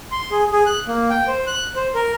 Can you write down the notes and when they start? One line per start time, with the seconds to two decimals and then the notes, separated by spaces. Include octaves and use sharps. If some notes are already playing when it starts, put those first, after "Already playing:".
0.12 C6
0.31 G#4
0.52 G#4
0.66 F#6
0.88 A#3
1.10 G5
1.28 C5
1.47 F#6
1.76 C5
1.95 A#4